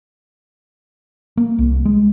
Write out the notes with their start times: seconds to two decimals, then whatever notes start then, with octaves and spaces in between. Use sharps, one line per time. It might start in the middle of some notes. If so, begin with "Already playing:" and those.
1.37 A#3
1.59 C2
1.85 G#3